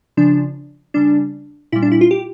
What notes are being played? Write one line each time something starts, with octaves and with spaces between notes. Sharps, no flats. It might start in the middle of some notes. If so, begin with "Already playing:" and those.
C#3 F3 D4
C#3 G3 D4
A#2 G3 E4
D4
E4
F4
G4